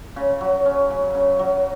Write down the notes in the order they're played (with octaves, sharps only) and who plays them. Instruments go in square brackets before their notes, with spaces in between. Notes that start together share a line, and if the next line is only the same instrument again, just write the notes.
[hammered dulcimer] C#3
F#3
C#4
C#3
C#3
F#3